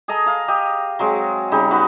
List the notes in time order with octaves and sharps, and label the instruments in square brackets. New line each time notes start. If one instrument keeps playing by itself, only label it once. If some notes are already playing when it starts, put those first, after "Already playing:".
[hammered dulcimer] G#4 A4 D#5 A#5
F5 A#5
G4 D#5
F#3 G#3 C4
C#3 G3 D#4
B3 D#4 F#4